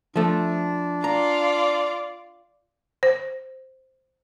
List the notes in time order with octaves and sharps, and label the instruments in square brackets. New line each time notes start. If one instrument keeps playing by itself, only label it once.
[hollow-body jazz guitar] F3 A3 [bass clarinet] D4
[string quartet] F4 D5 [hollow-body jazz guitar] A#5
[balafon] C5